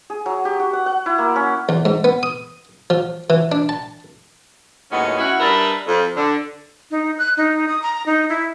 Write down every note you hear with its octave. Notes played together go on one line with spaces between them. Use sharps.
G#4
F#3
G4
F#4
F#5
F#5
E4
A#3
C#4
E2
G#2
B3
D#6
F3
E3
D4
A5
D#2 A2 F#3 G#3 B3 C#4
C#4 E4 F#4
G3 D4 A#4 B4 D#5 E5
F2
D3
D#4
F#6
D#4
D#6
A#5
D#4
E4